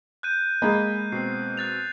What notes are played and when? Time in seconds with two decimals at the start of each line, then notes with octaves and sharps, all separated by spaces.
0.23 F#6 G6 D#7
0.62 G#3 A#3 D#5 G#5 B5
1.12 B2 C4 C7
1.57 F#6 A6 F7